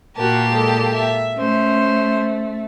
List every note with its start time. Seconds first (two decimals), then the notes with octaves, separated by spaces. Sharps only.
0.16 A#2 F#4 G4 A#4 A5
0.51 G#3 A4
0.92 E5
1.37 A3 C#4 C5